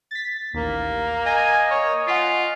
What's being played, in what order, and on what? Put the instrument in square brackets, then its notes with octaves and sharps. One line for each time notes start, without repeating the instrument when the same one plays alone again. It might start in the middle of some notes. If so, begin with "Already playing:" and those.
[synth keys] A6 B6
[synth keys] A1 D#2 [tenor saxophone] A#3
[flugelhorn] D#5 [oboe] G#5 [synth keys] G6 A#6
[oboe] C#5
[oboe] F4 [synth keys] F#5 G#5 B6